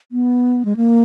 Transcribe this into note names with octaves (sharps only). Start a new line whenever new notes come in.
B3
G#3
A#3